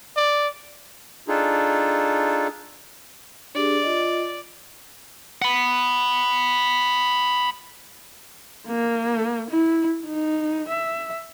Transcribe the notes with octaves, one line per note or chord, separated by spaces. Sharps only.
D5
D4 D#4 F4 G#4 A4
D4 G4 G#4 D5
F4 D#5
F#5 B5
A#3
E4
D#4
E5